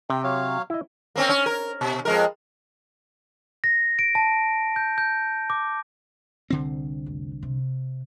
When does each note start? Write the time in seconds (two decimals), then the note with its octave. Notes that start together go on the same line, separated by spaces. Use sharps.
0.10 C3 G5
0.24 F#3 C#5 F5
0.70 E4 D#5
1.16 A#3 C4 C#4
1.29 C#4
1.46 A#4
1.81 B2
2.05 F2 G#3 A#4
3.64 A#6
3.99 D7
4.15 A5
4.76 G6
4.98 G6
5.50 D6
6.50 C2 D3 C4
7.06 F1
7.43 C3